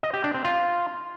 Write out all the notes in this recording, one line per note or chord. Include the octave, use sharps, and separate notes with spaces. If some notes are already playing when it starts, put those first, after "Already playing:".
D#5
G4
D4
C4
F4